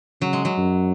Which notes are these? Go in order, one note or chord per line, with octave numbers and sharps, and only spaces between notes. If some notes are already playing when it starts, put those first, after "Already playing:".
C#3 F#3
G#3
F#3
F#2